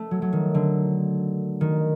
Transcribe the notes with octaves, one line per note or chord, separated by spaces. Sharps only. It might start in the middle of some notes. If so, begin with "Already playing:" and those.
Already playing: A3
F#3
F#3
D#3
D3
D#3